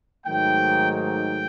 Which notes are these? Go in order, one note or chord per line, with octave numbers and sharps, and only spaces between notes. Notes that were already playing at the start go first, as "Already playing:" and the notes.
G#2 D#3 F#3 A3 G5
G5